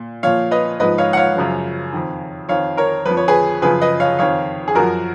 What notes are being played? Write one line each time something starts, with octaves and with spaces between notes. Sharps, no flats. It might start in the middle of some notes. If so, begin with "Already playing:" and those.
Already playing: A#2
A#2 F3 C#5 F5
B4 D#5
G#2 F3 B4 D#5
C#5 F5
F#5
C#5 F5
F#2 C#3 F3
F2 D#3
F2 D#3 C#5 F5
A#4 C#5
F2 B4
F3
C#5
G#4 B4
F#2 C#3 F3 G#4 B4
B4 D#5
C#5 F5
F2 D#3 C#5 F5
G#4
F#2 F3 F#4 A#4